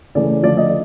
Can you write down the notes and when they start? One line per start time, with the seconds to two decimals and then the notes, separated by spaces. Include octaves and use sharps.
0.15 C#3 E3 A3 D5
0.43 D3 F3 A3 D5
0.57 D#5